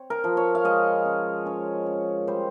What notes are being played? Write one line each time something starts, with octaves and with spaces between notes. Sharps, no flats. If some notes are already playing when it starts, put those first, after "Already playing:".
Already playing: C4 C#5
A#4
F3
C#5
F5
G#3 D#5
C#3
C#4 C#5
C#4
G3 C5